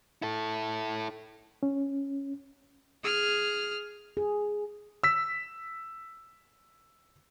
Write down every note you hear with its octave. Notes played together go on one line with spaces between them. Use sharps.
E4 A4
C#4
G#4 F6
G#4
E6 B6